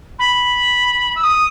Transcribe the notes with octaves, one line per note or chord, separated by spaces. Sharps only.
B5
E6
D#6